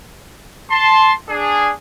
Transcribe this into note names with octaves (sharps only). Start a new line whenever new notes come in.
A5 C6
D4 G#4